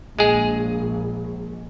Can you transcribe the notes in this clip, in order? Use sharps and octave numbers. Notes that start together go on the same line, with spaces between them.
A#1 G#3 G#4